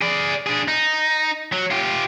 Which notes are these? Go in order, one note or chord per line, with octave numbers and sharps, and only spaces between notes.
G#4 D5
D4 G#4
D#4
F#3
F4 G4